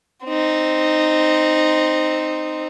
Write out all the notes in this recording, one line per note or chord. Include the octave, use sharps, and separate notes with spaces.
C4 D#4